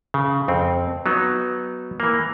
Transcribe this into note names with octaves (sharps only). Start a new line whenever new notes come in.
C#3
F2 C4
F#3 B3 D#4
E3 A#3